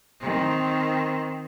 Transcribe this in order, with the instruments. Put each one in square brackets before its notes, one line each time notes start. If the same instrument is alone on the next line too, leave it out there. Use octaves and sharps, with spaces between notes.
[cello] D#3 C4